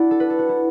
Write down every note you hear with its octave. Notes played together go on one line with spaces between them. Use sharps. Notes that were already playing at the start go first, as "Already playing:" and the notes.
Already playing: D4 E4 F#4 D5
A4
B4
A4
F#4
E4